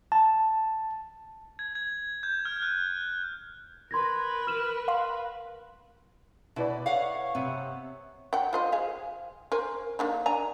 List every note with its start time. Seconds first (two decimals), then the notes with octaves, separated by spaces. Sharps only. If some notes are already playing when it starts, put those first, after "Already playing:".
0.12 A5
1.59 G#6
1.75 G#6
2.23 G6
2.45 F6
2.62 F#6
3.91 A#4 B4 C6 G#6 A#6
4.47 F6 E7
4.88 F5 C6
6.56 B2 E4 B4 D5
6.86 C#5 F5 F#5
7.35 C3 B3
8.33 F#5 G5
8.53 F4 C5 D#5
8.72 G#4 F5
9.52 A#4 C5 G#5
9.99 A#3 D4 D#4
10.26 D4 G#5 A#5